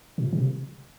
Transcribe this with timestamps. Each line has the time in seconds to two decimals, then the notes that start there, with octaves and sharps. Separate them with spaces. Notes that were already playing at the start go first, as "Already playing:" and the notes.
0.18 A#2
0.33 C3